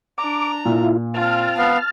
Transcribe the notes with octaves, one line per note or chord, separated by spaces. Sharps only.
D4 A#5 D6
A#2 E4 F4
C4 F4 A5 F6
B3 F5